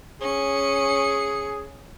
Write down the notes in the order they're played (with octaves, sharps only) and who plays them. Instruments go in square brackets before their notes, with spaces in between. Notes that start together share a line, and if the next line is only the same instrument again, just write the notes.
[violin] C#4 C#7 [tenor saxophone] G#4